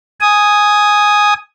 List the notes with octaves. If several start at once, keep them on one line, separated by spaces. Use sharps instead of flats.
G#5 D#6